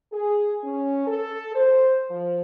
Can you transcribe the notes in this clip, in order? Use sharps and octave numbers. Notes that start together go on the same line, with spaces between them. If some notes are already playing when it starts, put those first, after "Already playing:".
G#4
C#4
A4
C5
F3